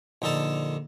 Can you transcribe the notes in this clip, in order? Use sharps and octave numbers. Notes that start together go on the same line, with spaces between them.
A#1 D3 D#4 A4 A5